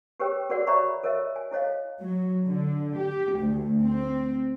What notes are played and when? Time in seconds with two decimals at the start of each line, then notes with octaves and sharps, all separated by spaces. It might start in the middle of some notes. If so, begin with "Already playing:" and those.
0.20 G4 G#4 A#4 B4 C#5 G5
0.49 F#4 G#4 A#4 B4 D5 F#5
0.67 C#5 D5 E5 A#5 B5 C#6
1.03 A4 A#4 C#5 D#5 E5
1.36 G#5
1.51 E4 A4 C#5 D#5 F5
2.02 F#3
2.46 D3
2.98 G4
3.38 D2
3.84 C4